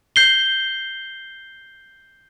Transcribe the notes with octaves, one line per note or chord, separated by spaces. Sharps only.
G6 C7 G7